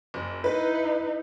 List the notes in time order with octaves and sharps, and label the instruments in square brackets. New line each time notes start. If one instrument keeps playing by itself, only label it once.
[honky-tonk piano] F#1
[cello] D#4 E4 [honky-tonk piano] B4